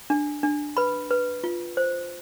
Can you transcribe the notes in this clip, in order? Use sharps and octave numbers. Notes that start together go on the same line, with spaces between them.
D4
D4
B4 B5
B4
F4
C5